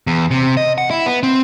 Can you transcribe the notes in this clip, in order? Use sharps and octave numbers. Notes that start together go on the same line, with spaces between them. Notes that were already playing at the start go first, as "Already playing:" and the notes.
E2
C3
D#5
F#5
E4
B3
C4